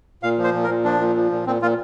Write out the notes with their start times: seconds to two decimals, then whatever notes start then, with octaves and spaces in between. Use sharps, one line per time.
0.23 A#2 F5
0.38 F3
0.44 C5
0.54 A#2
0.64 A#4
0.69 A#2
0.85 F3 D4
1.00 A#2
1.16 F3
1.31 A#2
1.47 A#2 C4
1.62 A#2 F4